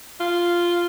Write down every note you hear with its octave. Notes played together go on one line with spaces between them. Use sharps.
F4